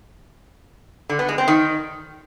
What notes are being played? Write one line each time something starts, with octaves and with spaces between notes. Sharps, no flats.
D3
B3
G#3
C4
D#3